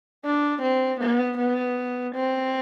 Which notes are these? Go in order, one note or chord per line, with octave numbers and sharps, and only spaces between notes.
D4
C4
B3
B3
C4